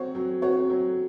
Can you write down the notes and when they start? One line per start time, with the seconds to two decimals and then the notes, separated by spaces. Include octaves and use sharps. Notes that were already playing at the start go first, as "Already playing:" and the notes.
Already playing: F#3 C4 F#4 C#5
0.15 F#3
0.42 C4 F#4 C#5
0.70 F#3